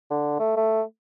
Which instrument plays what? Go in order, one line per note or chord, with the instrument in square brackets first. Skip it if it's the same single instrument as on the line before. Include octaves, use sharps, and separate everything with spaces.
[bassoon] D3
A3
A3